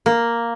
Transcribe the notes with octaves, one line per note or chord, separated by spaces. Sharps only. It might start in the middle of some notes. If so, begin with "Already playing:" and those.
A#3